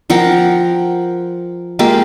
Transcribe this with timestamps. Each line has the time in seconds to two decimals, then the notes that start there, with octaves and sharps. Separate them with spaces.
0.10 F3 A#4 F#5 G5
1.79 G#3 A#3 F4 G4